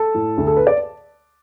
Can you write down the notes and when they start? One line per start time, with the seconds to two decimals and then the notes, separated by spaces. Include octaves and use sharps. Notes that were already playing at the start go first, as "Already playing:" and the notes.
Already playing: A4 A5
0.14 A2
0.38 D2
0.47 A4
0.57 B4
0.67 D5